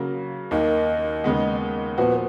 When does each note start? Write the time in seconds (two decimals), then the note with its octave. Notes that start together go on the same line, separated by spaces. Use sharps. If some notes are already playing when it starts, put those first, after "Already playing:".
Already playing: C#3 F#3 A#3
0.51 D#2 D#3 A#3 D#5
1.24 D#2 C#3 G#3 B3
1.97 A#2 F3 B3 F#4 B4